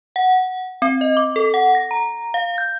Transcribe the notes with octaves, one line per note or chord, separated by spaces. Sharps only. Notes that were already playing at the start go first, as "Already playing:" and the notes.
F#5
C4
D#5
D6
A4
F#5
A#6
A#5
F5
G6